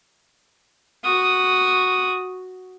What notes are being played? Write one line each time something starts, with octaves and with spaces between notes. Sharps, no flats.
F#4 D#6